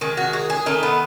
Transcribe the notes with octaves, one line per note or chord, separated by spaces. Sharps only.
D#3 G#3
F#4
G#4
G#4
D#3 A3 D#4
B3